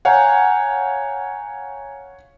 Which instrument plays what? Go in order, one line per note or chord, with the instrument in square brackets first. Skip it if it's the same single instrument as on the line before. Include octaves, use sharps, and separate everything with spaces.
[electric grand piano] C#5 F5 F#5 [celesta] G#5 A#5 G6